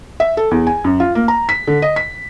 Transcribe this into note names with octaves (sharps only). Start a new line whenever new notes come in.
E5
A4
E2
G#5
F#2
F4
A#3
A#5
B6
D3
D#5
B6